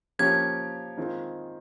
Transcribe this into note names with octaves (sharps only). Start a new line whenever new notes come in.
F3 A#3 C#4 G4 G#6
D#3 G#3 C4 F4 G#4